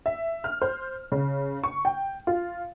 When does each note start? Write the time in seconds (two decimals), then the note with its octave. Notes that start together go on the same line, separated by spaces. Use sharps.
0.06 E5
0.44 F6
0.62 C5
1.12 C#3
1.64 C#6
1.85 G5
2.27 F4